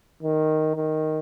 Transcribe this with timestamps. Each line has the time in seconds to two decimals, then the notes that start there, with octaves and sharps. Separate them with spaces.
0.23 D#3
0.76 D#3